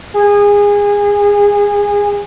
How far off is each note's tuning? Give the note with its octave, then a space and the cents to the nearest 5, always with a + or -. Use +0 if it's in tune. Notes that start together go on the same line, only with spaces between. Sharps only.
G#4 -25